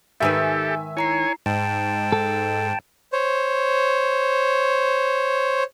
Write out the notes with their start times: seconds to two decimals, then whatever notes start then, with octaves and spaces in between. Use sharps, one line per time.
0.20 G#2 D#3 G4 A4 B4 E5 G#5 E6
0.97 E4 C#5 G#5 A#5 C7
1.46 G#2 G5 A5
2.12 A4
3.13 C5 C#5